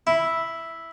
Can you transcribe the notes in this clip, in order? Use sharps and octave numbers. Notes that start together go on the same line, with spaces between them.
E4